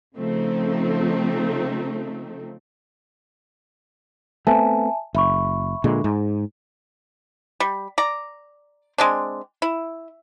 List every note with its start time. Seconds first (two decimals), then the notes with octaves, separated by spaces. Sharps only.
0.17 C#3 F3 A3 C4 D#4
4.47 A3 B3 C4 E5 G#5 A5
5.15 F#1 E5 B5 C#6
5.84 A#2 D3 G#3
6.04 G#2
7.60 G3
7.98 D5 A#5
8.98 G#3 C4 D4
9.62 E4